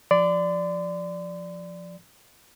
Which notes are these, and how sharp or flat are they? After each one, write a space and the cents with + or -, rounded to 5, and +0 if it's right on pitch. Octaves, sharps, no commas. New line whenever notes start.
F3 +0 D5 +0 C6 -40